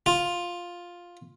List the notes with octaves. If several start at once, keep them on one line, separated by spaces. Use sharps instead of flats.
F4